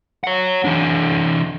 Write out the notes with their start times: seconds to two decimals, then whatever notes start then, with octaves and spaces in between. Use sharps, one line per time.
0.24 C#5 F#5
0.65 E3 D4